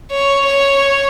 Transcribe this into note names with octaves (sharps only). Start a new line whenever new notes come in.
C#5
C#5